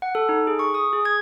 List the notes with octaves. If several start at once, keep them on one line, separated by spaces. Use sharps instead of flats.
F#5
A4
D#4
G#4
C#6
D#6
G#4
G#6